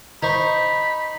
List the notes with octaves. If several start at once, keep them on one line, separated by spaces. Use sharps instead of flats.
D#4 C5 B5 C#6